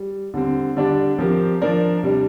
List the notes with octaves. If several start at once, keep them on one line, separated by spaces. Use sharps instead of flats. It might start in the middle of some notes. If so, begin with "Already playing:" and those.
Already playing: G3
D3 G3 C4
D3 G3 D4 G4 D5
F3 C4 G4 A#4
F3 D4 A#4 D5
C3 G3 D4